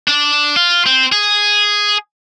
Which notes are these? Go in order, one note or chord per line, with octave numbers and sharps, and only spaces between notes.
D4
F4
C4
G#4